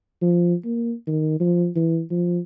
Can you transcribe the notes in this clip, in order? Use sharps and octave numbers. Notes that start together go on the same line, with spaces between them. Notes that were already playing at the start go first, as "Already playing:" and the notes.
F3
A#3
D#3
F3
E3
F3